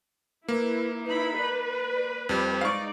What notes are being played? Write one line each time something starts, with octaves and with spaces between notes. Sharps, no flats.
A#3 E4 B4
D#4 E4 B4 B5
B4 D5
F2 G3 C5
G#3 D#4 D5 F5 C#6